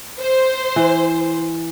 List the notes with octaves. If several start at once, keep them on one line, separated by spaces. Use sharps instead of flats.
C5
E3